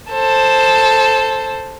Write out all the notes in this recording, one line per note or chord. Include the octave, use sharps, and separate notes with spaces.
A4 C5